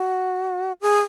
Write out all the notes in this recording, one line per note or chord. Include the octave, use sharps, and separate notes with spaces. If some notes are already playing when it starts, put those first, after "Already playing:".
Already playing: F#4
G#4